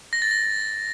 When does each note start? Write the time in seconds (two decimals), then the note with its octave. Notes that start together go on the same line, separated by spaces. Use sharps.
0.13 A#6
0.22 A6
0.31 A#6